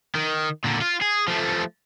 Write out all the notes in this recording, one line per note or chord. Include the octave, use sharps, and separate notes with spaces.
D#3
A#2 D3
F4
G#4
F3 A3